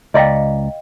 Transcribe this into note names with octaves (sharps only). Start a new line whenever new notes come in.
C#2 D5 D#5 F5 G5 A#5